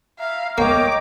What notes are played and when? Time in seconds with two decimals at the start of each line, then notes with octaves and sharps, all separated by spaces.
0.19 E5 F5 A#5
0.58 A#3 C#5 D#5 G5 A#5 D6